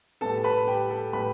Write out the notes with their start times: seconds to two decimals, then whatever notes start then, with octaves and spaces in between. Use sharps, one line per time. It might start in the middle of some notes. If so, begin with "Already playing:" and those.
0.21 A2 G3 B3 A4 A5
0.44 B4 B5
0.67 G4 G5
0.90 A4 A5
1.13 A2 G3 B3 B4 B5